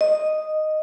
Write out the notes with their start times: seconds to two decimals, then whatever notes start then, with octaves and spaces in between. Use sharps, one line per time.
0.01 D#5